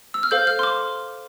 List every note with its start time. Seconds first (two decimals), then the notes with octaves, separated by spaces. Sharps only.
0.14 E6
0.23 F6
0.31 A4 C5 F5 G6
0.47 F6
0.59 C6
0.63 D6